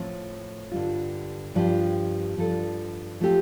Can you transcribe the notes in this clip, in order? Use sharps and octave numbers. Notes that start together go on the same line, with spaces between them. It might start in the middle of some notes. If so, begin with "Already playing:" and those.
Already playing: A2 F3 C4
G2 D3 G3 F4
G2 F3 D4 G4
G2 F3 D4 A4
F3 A3 C4 G4